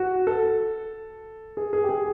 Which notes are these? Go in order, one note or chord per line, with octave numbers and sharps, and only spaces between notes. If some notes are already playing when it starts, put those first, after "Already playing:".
Already playing: F#4
A4
G#4
G#4
G4
G#4